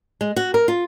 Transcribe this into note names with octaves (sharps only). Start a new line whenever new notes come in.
G#3
F#4
A#4
F4